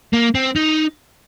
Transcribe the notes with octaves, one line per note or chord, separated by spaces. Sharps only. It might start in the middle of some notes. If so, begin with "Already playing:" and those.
A#3
C4
D#4